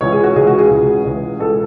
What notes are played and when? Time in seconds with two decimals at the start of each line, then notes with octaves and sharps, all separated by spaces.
0.01 C#2 C#3 E3 C#5
0.12 G#4
0.24 F#4
0.35 C#2 C#3 E3 G#4
0.47 F#4
0.58 G#4
0.70 C#2 C#3 E3
1.05 C#2 C#3 E3
1.39 C#2 B2 A4